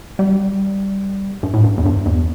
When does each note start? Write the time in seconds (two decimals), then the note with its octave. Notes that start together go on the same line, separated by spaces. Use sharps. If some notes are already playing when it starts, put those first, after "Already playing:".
0.19 G3
1.43 G2
1.54 A2
1.64 G2
1.78 E2
1.86 G2
2.06 E2